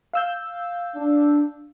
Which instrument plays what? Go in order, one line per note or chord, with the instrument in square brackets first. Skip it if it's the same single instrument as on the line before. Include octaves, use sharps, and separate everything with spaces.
[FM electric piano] F5 E6 G6
[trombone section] D4